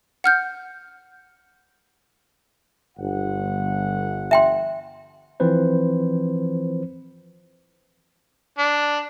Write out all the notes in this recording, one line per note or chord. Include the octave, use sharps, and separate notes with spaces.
F#5 F6 G6
G1 F#5
E5 G5 C6
E3 F3 C4 B4 C5
D4